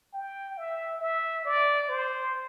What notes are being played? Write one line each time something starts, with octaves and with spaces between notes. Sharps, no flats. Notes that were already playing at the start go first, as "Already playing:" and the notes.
G5
E5
E5
D5
C5